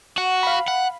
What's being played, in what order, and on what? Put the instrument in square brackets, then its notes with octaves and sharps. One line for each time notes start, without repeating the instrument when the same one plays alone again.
[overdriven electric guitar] F#4 [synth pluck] F#5
[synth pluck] F5 B5
[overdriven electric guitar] F#5